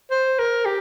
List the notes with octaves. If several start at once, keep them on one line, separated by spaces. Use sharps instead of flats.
C5
A#4
G4